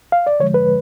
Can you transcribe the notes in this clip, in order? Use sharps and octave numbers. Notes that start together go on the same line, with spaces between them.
F5
D5
D3 F3 G#3 C#5
B4